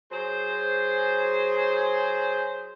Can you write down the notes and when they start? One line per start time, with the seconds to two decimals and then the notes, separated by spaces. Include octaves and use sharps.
0.11 F#3 G#4 C5